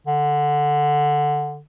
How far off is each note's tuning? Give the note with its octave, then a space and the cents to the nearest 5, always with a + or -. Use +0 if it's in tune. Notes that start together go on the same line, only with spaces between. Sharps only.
D3 +5